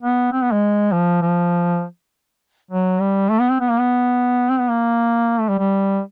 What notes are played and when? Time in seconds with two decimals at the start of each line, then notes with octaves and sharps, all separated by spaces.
0.03 B3
0.33 C4
0.43 B3
0.53 G#3
0.92 F3
1.22 F3
2.71 F#3
3.01 G3
3.30 A3
3.40 B3
3.50 C4
3.60 B3
3.71 A#3
3.80 B3
4.50 C4
4.60 B3
4.70 A#3
5.40 A3
5.49 G3
5.59 G3